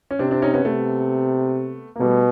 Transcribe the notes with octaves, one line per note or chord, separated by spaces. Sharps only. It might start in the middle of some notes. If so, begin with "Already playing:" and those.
C#4
C3 C4 D4
C4 D4
C#4 D#4
B3 C#4
C3 A3 B3
A#3
B2 G3 A3